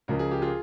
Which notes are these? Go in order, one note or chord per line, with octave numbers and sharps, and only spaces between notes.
C#2 C#3 F3 A#4
G#4
G4
F4 G#4